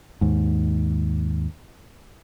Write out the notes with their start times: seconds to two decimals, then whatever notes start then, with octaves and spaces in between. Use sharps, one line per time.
0.21 D#2 G#2